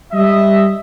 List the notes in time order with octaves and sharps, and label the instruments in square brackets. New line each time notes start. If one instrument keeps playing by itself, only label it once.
[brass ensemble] G3 D#5 E5